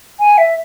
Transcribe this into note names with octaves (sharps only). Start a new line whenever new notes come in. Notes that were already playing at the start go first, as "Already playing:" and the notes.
G#5
E5